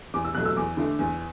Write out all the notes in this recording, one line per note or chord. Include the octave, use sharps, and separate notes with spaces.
E2 D6
E6
B2 F#3 A3 F#6
E6
E2 D6
D3 A3
E2